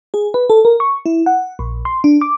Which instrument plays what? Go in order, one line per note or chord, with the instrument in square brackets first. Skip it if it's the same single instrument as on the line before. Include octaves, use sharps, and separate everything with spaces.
[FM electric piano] G#4
B4
A4
A#4
C#6
E4
F#5
A#1
C6
D4
D6